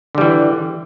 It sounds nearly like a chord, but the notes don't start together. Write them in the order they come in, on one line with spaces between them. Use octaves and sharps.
D3 G3 E3